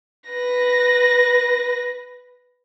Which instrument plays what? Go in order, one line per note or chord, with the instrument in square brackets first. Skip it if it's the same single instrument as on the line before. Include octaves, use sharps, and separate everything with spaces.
[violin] B4 A#6